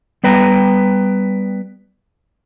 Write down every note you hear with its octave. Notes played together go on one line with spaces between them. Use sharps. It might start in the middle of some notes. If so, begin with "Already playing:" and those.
G3 B3 B4 G5 A#5